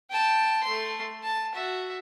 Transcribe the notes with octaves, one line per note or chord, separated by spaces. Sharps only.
G5 A5
A3 C6
A5
F#4 E5